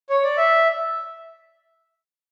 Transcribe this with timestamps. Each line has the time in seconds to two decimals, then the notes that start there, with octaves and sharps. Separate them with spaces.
0.10 C#5
0.23 D5
0.37 E5